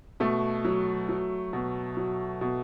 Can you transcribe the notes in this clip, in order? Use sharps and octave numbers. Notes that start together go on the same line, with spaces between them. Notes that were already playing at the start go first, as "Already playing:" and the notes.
B2 A3
F#3
F#3
B2
F#3
B2